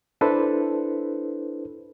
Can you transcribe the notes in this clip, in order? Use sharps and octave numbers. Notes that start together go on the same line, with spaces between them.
D4 E4 A4 B4 C5